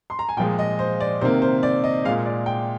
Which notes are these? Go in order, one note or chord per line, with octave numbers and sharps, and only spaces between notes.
C6
A#5
G#5
A#2 F3 G#3 G5
D#5
C5
D5
C3 D#3 A#3 C5
C5
D5
D#5
A#2 G#3 F5
D5
G5